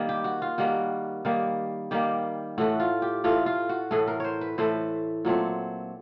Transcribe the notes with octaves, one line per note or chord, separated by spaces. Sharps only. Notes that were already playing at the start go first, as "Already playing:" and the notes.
Already playing: D#3 G3 A#3
G4
F#4
F4
D#3 G3 A#3 F#4
D#3 G3 A#3
D#3 G3 A#3 G4
A2 E3 A3 F#4
F4
G4
A2 E3 A3 F4
F4
F#4
A2 E3 A3 G#4
A#4
C5 C#5
B4
A2 E3 A3 C5
A#2 F#3 A3 C4